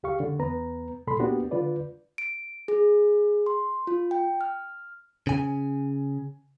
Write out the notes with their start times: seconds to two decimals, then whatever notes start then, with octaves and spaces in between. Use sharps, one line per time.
0.03 C#2 G4 F5 C#6
0.20 D3
0.39 E2 B3 B4 A#5
1.07 C2 A#2 A4 B5 C6
1.20 A#3 B3 D4 F#4 G4
1.51 D3 F4 B4 D5
2.18 D7
2.68 G#4
3.46 C6
3.87 F4
4.11 G5
4.41 F6
5.27 C#3 G#5